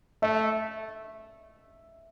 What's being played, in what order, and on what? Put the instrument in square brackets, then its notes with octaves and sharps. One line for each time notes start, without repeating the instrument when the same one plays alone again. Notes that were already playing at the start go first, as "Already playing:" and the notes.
[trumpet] A3 [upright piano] E5